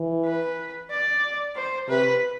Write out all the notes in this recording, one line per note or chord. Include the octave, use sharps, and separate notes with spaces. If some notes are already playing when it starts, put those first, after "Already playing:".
Already playing: E3
B4
D5
C5
C3 B4